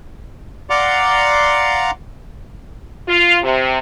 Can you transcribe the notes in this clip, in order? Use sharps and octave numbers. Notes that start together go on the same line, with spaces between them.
D5 F5 F#5 A#5 C6 D6
F4
C3